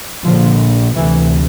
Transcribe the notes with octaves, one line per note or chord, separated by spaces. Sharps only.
A#1 A#2 D3 F3
D2 C3 E3